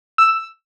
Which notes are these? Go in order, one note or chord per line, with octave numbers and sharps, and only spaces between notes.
E6